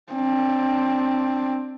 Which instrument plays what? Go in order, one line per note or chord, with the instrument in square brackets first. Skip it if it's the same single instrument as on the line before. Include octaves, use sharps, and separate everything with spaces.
[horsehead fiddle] C4 D4